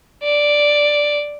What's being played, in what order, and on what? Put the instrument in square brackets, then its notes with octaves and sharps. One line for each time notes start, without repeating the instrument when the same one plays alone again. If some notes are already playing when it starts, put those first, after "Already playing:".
[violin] D5